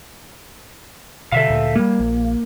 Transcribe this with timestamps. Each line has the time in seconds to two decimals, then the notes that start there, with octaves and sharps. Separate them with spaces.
1.32 B2 D3 A4 E5 F5
1.50 D2 A#2
1.76 G3 A3 A#3
2.00 A#1